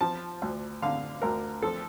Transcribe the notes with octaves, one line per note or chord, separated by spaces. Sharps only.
F3 A5
D2
D3 F5
D2 A#4
F3 A4